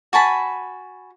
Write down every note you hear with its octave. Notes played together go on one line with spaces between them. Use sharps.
F#4 G#5 A5 B5